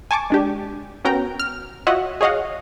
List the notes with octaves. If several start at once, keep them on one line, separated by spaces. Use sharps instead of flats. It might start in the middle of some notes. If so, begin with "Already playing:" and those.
G#5 A5 C#6 D6
G#3 D4 G4
B3 C#4 F#4 A#4 G5 A#5
F6
F4 F#4 C#5 D#5 E5 F#5
G#4 C#5 D#5 F5 F#5